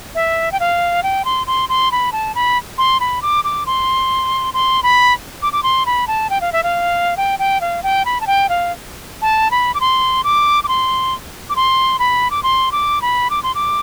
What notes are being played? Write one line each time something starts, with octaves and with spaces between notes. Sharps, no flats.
E5
G5
F5
G5
C6
C6
C6
B5
A5
B5
C6
B5
D6
D6
C6
C6
B5
D6
D6
C6
B5
A5
G5
F5
E5
F5
G5
G5
F5
G5
B5
A5
G5
F5
A5
B5
D6
C6
D6
D6
C6
D6
C6
B5
D6
C6
D6
B5
D6
C6
D6